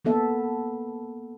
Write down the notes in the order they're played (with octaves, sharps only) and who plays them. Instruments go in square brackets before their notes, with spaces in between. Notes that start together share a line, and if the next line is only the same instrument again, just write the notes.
[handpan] A#3 B3 A4 E5